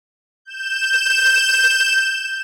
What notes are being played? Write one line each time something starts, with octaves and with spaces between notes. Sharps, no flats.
G6 E7